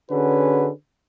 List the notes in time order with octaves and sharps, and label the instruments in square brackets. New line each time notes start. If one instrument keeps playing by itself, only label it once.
[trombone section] D3 C#4 F#4 G#4 B4